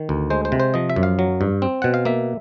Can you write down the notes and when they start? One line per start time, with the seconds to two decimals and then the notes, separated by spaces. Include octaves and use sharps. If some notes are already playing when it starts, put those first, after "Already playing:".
Already playing: D#3
0.09 D2
0.30 G#3 C5
0.45 C5
0.52 C3
0.60 C5
0.74 F3 D#5
0.90 E5
0.96 F#2
1.03 F5
1.19 F#3
1.41 G2
1.62 C4
1.82 B2 F#5
1.94 F5
2.05 A#3 E5